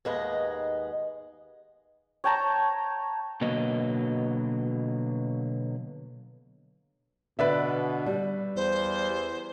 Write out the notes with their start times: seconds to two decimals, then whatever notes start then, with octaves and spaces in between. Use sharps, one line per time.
0.05 D#2 G#2 G#3 B3 B4 D#5
2.24 C#5 G5 A5 A#5
3.41 B2 D3 F#3 A#3 B4 D#5
7.39 B2 D3 B4 D5 E5
8.06 G3
8.56 E2 C5